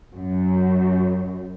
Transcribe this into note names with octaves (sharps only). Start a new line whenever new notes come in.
F#2